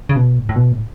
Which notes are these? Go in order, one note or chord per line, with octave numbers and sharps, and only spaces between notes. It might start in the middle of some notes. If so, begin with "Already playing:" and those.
C#3
B2
A2
A2
B2
A2